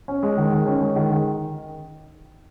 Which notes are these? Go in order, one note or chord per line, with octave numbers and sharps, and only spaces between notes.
C#4
G#3
D#3
D#3
C#4
G#3
D#3
D#3